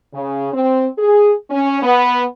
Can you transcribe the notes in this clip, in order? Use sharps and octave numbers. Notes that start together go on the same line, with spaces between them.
C#3
C4
G#4
C#4
B3